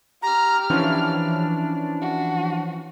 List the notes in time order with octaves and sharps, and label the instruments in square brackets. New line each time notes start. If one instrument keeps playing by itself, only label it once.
[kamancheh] G4 F6 [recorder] A#5
[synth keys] E3 F3 C#4 [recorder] D4
[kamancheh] F#4